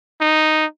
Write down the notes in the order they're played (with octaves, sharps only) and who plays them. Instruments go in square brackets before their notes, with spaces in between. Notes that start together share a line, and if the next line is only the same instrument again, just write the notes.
[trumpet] D#4